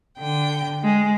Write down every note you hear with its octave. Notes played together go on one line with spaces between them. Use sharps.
D3 G5
G#3